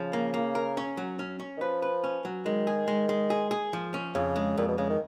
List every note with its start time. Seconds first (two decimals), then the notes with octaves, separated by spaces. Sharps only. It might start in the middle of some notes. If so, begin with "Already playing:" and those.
Already playing: C#3 F3
0.13 A#3
0.34 A#3
0.55 A#4
0.77 C#4
0.97 F#3
1.19 C#4
1.40 C#4
1.57 D#3
1.61 F3 B4
1.82 B4
2.04 C#4
2.25 F#3
2.46 D#3 G#3
2.67 G#4
2.88 G#3
3.09 G#3
3.30 G#4
3.51 G#4
3.73 F3
3.94 C#4
4.15 F2 C#3
4.36 G#3
4.58 F2 A#2
4.68 B2
4.78 C#3 G#3
4.90 D#3